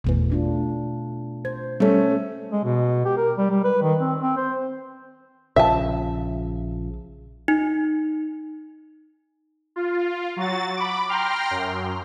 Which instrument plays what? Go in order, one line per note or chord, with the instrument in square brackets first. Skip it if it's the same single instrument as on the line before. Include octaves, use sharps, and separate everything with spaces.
[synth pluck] G#1 E2 E3 [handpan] B2 A3
[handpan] A3 D4 F4
[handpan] C5 [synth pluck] G#6
[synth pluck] G3 A4 [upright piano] A3 C#4
[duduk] G#3
B2
G4
A#4
G3
G3
B4
D#3
C4
C4
C5
[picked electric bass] A#1 C#3 F3 [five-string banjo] E5 A5
[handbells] D#4
[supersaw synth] F4
F#3 F#4 A6
B5 D6
G5 A#5 C6 F6
F#2